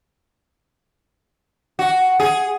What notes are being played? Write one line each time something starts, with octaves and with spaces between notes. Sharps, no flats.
F#4
G#4